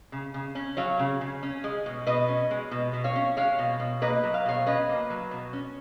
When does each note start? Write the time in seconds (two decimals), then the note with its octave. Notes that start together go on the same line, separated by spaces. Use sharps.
0.12 C#3
0.34 C#3
0.55 C#4
0.77 F#3 C#5 F5
0.99 C#3
1.21 C#3
1.43 C#4
1.64 G#3
1.86 B2
2.07 B2 B4 D#5
2.28 C#4
2.51 G#3
2.71 B2
2.93 B2
3.04 C#5 F5
3.16 C#4
3.37 G#3 C#5 F5
3.59 B2
3.80 B2
4.02 A#3 B4 D#5
4.24 F#3
4.34 F5
4.45 B2 C#5 F5
4.66 C#4 B4 D#5
4.89 A#3
5.10 F#3
5.31 B2
5.53 C#4